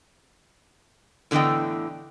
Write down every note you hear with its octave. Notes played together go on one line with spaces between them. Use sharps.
A2 D3 E3 B3 D#5 G5